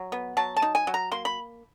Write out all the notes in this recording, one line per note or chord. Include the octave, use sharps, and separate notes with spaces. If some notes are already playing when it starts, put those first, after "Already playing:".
Already playing: F#3
B3
F#3 A5
A5
D#4
G#5
F#3
A#5
A#3 C6
B5